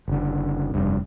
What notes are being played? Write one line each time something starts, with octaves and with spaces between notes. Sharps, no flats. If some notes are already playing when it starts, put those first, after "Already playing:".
F#1 D3
F1 G2